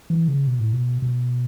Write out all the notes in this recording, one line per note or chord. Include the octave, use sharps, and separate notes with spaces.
E3
C#3
B2
A2
B2
B2